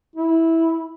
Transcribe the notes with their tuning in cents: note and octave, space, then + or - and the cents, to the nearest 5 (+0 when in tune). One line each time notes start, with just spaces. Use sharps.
E4 -10